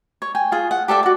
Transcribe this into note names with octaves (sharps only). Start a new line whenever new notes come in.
C#5
G5 G#5
F4 G#4
F#5
G4 A4 D5 E5
F#4 D5